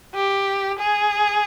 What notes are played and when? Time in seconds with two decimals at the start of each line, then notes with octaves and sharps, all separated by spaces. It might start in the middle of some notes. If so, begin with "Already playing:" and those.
0.15 G4
0.79 G#4